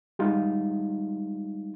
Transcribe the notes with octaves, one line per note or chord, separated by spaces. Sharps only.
G3 G#3 D#4 F4